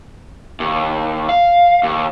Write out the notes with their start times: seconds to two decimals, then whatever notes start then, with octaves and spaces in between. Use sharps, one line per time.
0.60 D#2
1.29 F5
1.83 D#2